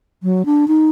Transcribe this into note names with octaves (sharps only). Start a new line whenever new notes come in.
F#3
D4
D#4